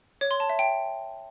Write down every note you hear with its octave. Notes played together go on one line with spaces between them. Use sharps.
C#5
C6
A5
E5
G5